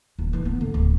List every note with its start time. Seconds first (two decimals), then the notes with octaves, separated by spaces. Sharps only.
0.19 D#1
0.33 E3 E4
0.45 B3
0.61 D3
0.74 D1